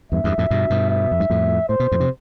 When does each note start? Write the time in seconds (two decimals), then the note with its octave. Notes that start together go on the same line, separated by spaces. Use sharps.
0.12 E2 G2 E5
0.24 E2 G2
0.38 F2 A2
0.50 G2 B2
0.70 G2 B2
0.90 E5
1.11 F2
1.20 G2
1.30 F2 A2
1.69 A2 C5
1.80 B2
1.92 F2 A2
2.00 C3